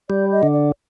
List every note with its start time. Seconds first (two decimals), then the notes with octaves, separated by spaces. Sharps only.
0.10 G3 D5
0.32 D#5
0.43 D3
0.53 D5